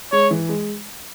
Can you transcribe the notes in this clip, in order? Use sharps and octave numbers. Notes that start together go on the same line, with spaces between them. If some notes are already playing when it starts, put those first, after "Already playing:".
G#3 C#5
E3
G#3